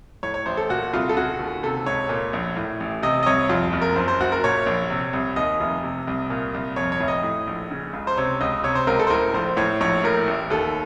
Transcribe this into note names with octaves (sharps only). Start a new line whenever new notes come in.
A2 C#5
C#5
A1 C5
A4
A#2 F#4
C2 F4
A4
C#3 F#4
D#2
C3 A4
C#2 C#5
A#2
A#1
A2
A1
C3 D#5
D#5
C2 C#5
F2 F4
F#1
A#4
F#2 C5
C5
F#1 F#4
A#4
A#2 C#5
A#1
C3
C2
D#2 D#5
F1
C3
C2
A#2
C2
F2 C#5
C#5
F1
D#5
A2
A#1
C#3
C#2
C5
C3 C#5
C#2 D#5
C3 C#5
C5
C#2 A#4
A4
C5
A2 A#4
A#1 C5
A2 C#5
A#1 C#5
A2 A#4
A1
D#2 A4